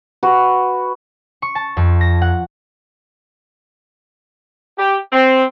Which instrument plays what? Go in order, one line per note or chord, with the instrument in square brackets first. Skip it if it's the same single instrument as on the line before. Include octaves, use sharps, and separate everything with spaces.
[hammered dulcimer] F#4 B4
[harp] C#6
A5
F2
A#6
F#5
[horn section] G4
C4